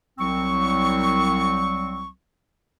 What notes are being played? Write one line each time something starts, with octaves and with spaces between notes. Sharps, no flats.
C2 F#3 C4 C#6